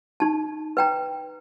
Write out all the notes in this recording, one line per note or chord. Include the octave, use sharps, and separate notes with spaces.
D#4 A5
B4 G5 A#5